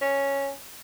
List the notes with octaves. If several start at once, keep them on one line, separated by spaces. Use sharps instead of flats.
C#4